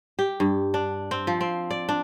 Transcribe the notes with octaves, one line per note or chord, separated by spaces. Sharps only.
G4
G2
D4
C4
F3
C4
D5
D4